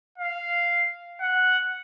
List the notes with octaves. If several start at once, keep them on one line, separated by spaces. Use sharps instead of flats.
F5
F#5